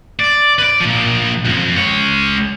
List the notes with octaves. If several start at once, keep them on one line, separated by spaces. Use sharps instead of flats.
D5
B4 D5
A#2 F3
C2 F2
G#3 C#5